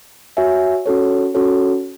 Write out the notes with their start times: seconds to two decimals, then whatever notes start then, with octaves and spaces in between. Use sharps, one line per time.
0.37 F#4 C#5 E5 G#5
0.86 C#4 F#4 A4 C#5
1.34 C#4 F#4 A4 C#5